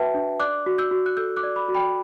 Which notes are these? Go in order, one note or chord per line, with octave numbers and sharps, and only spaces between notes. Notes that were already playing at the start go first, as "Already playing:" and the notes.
Already playing: F#4 B4 E5 G5 A5
D4
D5 D6 F#6
F#4
E6 G6
F#4
F#6
A4 E6 G6
D6 F#6
D5
B5 D6
F#4
G5 B5